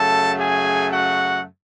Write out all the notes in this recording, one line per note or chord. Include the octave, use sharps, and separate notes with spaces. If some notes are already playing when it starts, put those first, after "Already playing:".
Already playing: F#2 C#3 F#3 A3 A4 A5
G#4 G#5
F#4 F#5